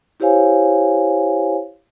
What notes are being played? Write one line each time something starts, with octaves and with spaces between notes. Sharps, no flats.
E4 G4 C5 C#5 F5 G#5